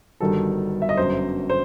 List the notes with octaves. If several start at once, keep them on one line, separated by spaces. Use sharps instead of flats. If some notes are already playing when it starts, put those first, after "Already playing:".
G1 G2 D#3 F#3 A4
E5
D#5
G1 F#2 F#3 C5
C5